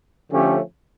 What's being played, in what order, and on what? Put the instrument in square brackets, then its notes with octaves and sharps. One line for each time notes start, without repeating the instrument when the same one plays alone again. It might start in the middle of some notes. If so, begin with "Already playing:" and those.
[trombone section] D3 F3 A3 C#4 G4